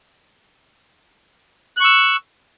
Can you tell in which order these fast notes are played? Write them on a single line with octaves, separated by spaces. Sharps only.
F#6 C#6 E6